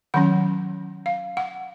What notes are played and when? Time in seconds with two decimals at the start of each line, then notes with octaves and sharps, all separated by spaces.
0.14 D#3 F#3 C#4 F#5
1.06 F5
1.37 F#5